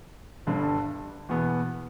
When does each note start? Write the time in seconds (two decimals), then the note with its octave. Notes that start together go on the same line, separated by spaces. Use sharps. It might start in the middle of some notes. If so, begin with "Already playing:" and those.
0.47 G1 G2 D3 G3
1.29 E2 B2 B3